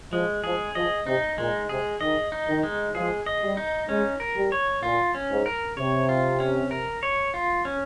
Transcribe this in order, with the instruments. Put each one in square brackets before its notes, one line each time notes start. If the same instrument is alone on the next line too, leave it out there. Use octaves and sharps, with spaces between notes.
[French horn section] F3 [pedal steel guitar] G#3
[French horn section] F3 [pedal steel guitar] G#4
[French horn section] F3 [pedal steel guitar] D#5
[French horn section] C3 [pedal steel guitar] D#4
[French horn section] A#2 [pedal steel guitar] G#3
[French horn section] C3 [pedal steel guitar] G#4
[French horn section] D#3 [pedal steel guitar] D#5
[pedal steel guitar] D#4
[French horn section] D#3
[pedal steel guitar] G#3
[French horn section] F3 [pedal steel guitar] G#4
[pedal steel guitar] D#5
[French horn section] G3
[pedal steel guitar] D#4
[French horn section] G#3 [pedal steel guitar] C#4
[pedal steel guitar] A#4
[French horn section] G3
[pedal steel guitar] C#5
[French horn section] A#2 [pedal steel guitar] F4
[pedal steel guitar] C#4
[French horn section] G#2
[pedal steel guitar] A#4
[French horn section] C3 [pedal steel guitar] C#5
[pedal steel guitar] F4
C#4
A#4
C#5
F4
C#4